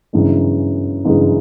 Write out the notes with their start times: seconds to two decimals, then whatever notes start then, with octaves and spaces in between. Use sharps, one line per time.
0.13 G1 F#2 C#3 E3 G#3
1.05 G1 F#2 C#3 E3 G#3